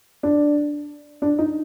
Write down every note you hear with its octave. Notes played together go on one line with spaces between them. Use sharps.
D4
D4
D#4